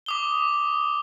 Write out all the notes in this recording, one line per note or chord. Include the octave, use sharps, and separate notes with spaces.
D6 D#6 G7